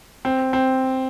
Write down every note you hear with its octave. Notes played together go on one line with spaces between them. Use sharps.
C4
C4